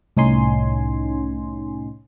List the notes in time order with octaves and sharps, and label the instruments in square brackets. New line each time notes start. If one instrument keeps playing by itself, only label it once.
[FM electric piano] C2 A2 C#4 D#4 G#5 C6